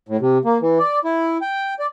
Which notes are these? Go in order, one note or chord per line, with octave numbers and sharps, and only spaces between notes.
A2
C3
A#3
E3
D5
E4
G5
D5